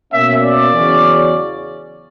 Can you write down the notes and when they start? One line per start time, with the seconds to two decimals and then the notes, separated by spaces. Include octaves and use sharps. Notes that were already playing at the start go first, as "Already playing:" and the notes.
0.12 B2 A#3 C#4 E5
0.42 D5
0.73 E2 C#3 F#3 C#4